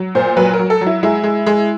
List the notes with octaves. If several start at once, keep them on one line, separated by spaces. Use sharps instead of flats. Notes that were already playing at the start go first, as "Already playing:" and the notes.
Already playing: F#3
A#2 C5
F#3 B4
A#4
F#3
A4
F#3
E4
G#3 E4
G#3
G#3